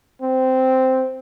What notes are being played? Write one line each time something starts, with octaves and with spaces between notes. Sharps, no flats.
C4